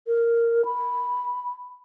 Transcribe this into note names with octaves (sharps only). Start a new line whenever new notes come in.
A#4
B5